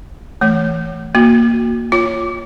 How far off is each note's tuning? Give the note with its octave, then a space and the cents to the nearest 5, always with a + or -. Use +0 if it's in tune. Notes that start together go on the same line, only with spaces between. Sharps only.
E3 +0 A3 +0 C#5 +0
A#3 +5 F#4 -15
F4 +0 C#5 +0 D6 +0